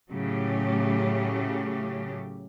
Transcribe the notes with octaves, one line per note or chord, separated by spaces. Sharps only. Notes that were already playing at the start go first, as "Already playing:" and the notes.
A2 C#3 F#3 A3 G4